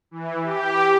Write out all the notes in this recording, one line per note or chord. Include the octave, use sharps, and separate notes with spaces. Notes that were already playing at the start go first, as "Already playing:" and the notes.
E3
G4